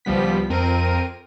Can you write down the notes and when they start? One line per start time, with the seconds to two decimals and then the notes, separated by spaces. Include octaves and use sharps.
0.05 C#2 F3 G3 B3 B6
0.50 F2 C4 A#4 D#7